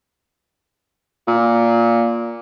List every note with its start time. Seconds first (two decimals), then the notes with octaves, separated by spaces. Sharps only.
1.27 A#2